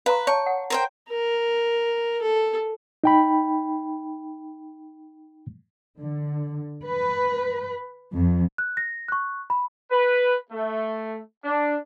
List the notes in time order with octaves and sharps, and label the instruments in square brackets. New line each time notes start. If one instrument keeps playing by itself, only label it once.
[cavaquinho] B4 [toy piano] F5 A#5 C6
[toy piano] C#5 A5 [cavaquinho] C#6
[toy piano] F#5
[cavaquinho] A#4 C5 G5
[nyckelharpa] A#4
A4
[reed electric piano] D#4 G5 B5
[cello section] D3
B4
F2
[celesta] F#6
A#6
C#6 F#6
B5
[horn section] B4
A3
D4